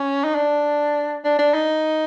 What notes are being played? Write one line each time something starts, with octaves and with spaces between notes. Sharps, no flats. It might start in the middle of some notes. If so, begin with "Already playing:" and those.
Already playing: C#4
D#4
D4
D4
D4
D#4